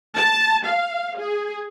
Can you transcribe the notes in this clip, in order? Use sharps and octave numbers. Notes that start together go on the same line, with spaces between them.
A5
F5
G#4